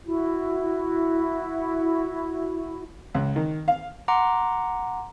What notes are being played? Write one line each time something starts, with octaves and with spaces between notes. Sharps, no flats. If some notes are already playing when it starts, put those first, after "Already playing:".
E4 F#4
C#2
D#3
F5
F#5 A#5 C6 D6